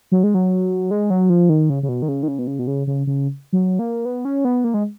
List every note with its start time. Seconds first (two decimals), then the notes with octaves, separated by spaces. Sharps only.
0.12 F#3
0.24 G#3
0.34 F#3
0.91 G#3
1.10 F#3
1.30 F3
1.49 D#3
1.70 C#3
1.83 C#3
1.89 B2
2.02 D#3
2.08 C#3
2.23 D#3
2.28 C#3
2.39 B2
2.47 C#3
2.59 B2
2.67 C#3
2.87 C#3
3.07 C#3
3.53 F#3
3.79 A#3
4.05 B3
4.25 C#4
4.45 B3
4.64 A#3
4.74 G#3